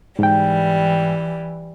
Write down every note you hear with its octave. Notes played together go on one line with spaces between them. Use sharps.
G#2 E3 G3 G5